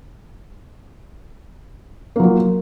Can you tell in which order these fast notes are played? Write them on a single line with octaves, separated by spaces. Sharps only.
A#3 F#3 F4